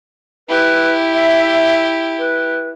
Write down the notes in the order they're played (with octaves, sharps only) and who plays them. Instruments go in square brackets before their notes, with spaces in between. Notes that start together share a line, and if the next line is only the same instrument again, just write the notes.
[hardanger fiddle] E4 G4 [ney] B4
[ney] E5
B4